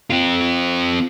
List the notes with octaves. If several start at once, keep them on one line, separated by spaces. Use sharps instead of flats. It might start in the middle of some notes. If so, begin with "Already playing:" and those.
C4 F4